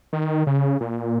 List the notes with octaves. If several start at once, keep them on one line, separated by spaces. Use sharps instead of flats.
D#3
C#3
A#2